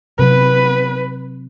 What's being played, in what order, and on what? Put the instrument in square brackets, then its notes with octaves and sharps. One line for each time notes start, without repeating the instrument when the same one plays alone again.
[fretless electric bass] C3 F#3 [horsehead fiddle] B4